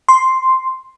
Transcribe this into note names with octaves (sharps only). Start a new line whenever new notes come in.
C6